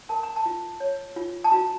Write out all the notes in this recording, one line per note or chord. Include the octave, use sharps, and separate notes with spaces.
A#4 A5
A#5
A5
F4
C#5
F4
A5
F#4 A#5